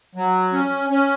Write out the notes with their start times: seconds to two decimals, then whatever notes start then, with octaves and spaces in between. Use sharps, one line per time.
0.15 F#3
0.53 C#4
0.90 C#4